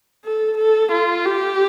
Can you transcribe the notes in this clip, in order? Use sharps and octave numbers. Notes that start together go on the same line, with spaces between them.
A4
A4
F4
G4